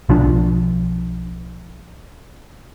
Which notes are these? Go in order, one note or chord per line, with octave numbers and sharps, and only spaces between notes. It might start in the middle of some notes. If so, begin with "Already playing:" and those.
B1 F3 D4